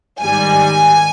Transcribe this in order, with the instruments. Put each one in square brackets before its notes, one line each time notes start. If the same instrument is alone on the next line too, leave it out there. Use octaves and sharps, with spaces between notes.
[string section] G#2 D#3 G3 G#5